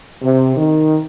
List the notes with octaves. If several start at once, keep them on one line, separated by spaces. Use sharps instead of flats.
C3
D#3